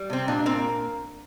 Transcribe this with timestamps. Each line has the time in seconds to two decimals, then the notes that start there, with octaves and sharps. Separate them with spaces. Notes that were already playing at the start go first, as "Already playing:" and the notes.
Already playing: G3
0.10 C3 C4
0.28 A#2 D4
0.46 A#3 C4